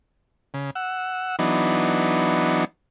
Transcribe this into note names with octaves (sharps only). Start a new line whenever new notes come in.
C#3
F#5 E6
E3 F#3 B3 D4 D#4